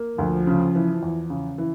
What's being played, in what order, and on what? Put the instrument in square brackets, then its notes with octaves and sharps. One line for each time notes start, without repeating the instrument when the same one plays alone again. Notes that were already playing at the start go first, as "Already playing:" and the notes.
Already playing: [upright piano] A#3
[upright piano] D2 [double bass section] F3
[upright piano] C#3
E3
E2
C#3
E3